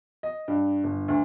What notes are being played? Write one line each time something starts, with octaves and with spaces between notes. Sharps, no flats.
D#5
G2
G1
D2